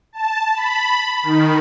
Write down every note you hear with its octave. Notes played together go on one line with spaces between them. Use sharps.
A5
B5
D#3